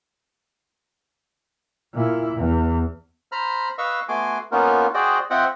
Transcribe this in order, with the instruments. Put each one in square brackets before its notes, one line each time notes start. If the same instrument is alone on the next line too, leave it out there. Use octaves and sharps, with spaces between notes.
[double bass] A#2 E4
E2
[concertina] C5 A#5 B5 F6
B4 D#5 F5 C#6 E6
A3 B3 F#4 G#5 C6 D6
A#3 B3 C#4 D#4 F4 A#4
F#4 G#4 C5 D5 D#5 G5
C4 F4 D#5 E5 F#5 G5